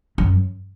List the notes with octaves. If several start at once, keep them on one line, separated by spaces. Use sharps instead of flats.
F#2